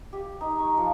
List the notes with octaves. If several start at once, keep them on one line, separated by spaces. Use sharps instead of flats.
G4
D#4
C#6
F3